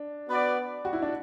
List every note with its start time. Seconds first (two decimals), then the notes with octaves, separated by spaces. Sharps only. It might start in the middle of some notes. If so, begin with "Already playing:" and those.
Already playing: D4
0.28 B3 F#4 B4 D5
0.85 F#4
0.93 E4
1.02 D4